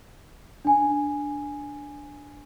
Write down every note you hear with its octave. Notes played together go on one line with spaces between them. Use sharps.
D4 G#5